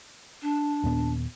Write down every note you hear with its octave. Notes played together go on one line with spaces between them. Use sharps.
D4
D#2 A#2 B3